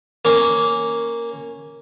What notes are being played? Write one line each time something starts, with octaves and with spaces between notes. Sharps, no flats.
A#3 C#4